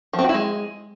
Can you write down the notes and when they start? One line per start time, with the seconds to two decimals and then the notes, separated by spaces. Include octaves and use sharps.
0.13 F3
0.19 C4
0.24 F#4
0.29 E4
0.34 G#3